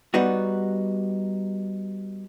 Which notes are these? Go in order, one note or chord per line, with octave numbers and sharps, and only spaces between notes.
G3 B3 D#4 F#4